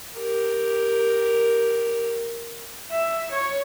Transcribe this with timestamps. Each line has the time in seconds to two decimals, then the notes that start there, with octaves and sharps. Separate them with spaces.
0.16 G4 A#4
2.91 E5
3.31 C#5